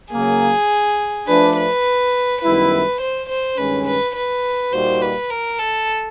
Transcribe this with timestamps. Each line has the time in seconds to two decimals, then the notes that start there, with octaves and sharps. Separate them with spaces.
0.12 C#3 F#3 A#3 G#4
1.27 F3 A3 D4 B4
1.57 B4
2.42 F#2 D#3 G3 B3 E4 B4
3.01 C5
3.29 C5
3.58 G2 D#3 G#3 C#4 B4
3.87 B4
4.16 B4
4.72 A#2 G3 A#3 D#4 F#4 C5
5.02 B4
5.30 A#4
5.59 A4